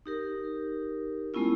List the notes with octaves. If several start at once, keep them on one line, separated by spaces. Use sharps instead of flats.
D#4 G4 A#4
G#3 A3 B3 C#4 E4 F4